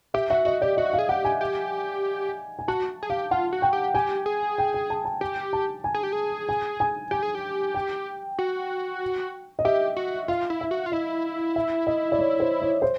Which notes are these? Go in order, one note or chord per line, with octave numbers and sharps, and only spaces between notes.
G4 E5
F#4 E5
F#4 D#5
G4 D5
F#4 D#5
F5
G#4
G4 F#5
G#5
G4
G#5
F#4 A5
G#4
G4 F5
F4 F#5
F#4
G5
G4
G4 G#5
G#4
G5
G5
A5
A5
G4 G#5
A5
G#5
G#4
G4
G#4
G#5
G#5
G4 G#5
G#4
G4
G5
F#4
D#5
G4 E5
F#4
F4 F5
E4
E5
F#4
F4
E4 D#5
E5
D#5
D5
C#5
C5
C#5
C5